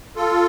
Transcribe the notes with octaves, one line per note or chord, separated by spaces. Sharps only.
F4 A4